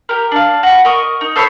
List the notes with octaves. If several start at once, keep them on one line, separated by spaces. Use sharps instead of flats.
G4 A#4
D4 F5
F#4 B5
A#4 D#5 C#6
D#4
A4 C5 C#5 B5